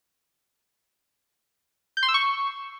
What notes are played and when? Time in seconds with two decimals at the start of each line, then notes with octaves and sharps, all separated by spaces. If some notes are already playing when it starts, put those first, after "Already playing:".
1.97 G6
2.03 C6
2.08 E6
2.14 C#6